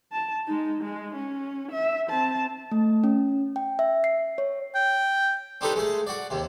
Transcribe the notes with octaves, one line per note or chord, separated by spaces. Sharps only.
A5
G#3 D#4
G#3
C#4
E5
C4 A5
A3
C#4
G5
E5
C7
C#5
G5
C4 D4 D#4 G4 A4 B4
G#3 A3 G#4
F#4 D5
D#2 C3